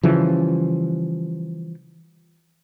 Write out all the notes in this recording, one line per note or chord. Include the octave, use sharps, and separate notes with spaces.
C#3 E3 F3 G3